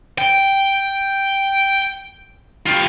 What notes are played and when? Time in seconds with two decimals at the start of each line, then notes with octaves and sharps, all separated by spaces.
0.18 G5
2.66 F4 G4